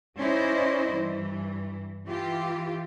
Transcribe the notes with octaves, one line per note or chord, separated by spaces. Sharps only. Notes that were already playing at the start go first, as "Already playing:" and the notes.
C#4 D#4 E4 C5 D5 D#5
G2 E3
E3 F4 G4